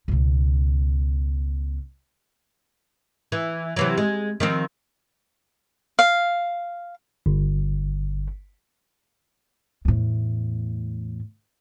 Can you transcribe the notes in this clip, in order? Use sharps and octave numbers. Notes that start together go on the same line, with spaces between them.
C#2 B2
E3
C3 E3 F#3
G#3
D#3 F3 C4
F5
G1
E2 A2